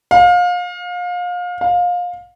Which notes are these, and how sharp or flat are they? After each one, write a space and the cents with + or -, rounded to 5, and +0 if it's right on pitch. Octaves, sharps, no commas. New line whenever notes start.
F5 +30
F5 +25